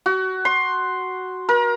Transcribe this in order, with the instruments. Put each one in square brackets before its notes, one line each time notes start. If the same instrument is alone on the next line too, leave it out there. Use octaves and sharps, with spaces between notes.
[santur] F#4
C6
A#4